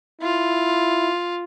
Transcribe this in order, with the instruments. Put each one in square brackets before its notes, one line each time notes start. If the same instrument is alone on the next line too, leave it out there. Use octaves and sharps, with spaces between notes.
[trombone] E4 [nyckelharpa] F4